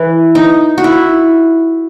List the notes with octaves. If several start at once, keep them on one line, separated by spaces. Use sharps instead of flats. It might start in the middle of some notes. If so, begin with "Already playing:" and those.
Already playing: E3
D#4
F#4
E4